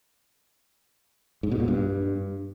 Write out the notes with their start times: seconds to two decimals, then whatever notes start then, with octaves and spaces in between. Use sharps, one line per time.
1.43 G#2
1.51 B2
1.60 A#2
1.68 G2